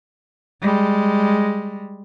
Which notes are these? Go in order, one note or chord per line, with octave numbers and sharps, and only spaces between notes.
G3 G#3